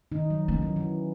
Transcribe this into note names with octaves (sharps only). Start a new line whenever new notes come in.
D#3 D#4
F#3
E3 C#4
F#3
E3